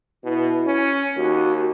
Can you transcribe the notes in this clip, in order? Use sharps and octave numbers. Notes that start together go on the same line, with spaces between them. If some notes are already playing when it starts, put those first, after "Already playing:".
B2 E4
C#4
D#2 F#4